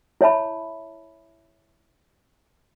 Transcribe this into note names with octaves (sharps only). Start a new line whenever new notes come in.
E4 C#5 E5 A5 B5